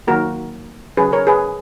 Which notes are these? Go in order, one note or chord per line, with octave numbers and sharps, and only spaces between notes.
D#3 F#3 A#3 F#4 A#4
C#3 F#3 C#4 G#4 B4
A#4 C#5
G#4 B4